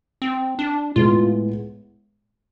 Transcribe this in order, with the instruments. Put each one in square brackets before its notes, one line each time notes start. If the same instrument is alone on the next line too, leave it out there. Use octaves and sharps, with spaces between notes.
[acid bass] C4
D4
[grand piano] A2 G#3 B3 [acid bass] F4